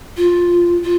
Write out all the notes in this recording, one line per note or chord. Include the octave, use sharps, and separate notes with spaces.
F4
F4